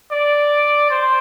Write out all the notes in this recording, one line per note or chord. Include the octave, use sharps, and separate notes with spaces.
D5
C5